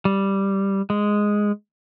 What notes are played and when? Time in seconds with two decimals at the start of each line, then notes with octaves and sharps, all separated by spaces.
0.05 G3
0.90 G#3